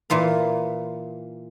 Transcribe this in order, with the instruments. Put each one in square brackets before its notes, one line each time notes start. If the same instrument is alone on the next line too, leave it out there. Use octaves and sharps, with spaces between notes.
[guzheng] A#2 E3 F4 A#4